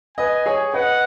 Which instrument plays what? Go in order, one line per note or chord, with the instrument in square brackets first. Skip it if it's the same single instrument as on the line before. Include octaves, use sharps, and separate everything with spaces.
[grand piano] B4 D#5 [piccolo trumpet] G#5
[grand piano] G#4 C#5
[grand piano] B4 D#5 [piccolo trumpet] F#5